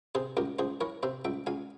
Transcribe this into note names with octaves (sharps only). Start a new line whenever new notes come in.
C3 G#4 C5
C#2 G4 A#4
C#2 G#4 C5
E3 A#4 C#5
C3 C5 E5
C#2 E5 G5
C#2 F5 G#5